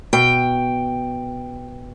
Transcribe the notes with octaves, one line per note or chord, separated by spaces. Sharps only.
B2 G5